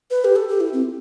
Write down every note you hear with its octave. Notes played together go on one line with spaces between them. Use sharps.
B4
G4
A4
G4
E4
C4